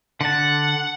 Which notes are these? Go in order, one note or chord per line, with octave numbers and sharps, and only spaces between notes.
D3 F#5 A5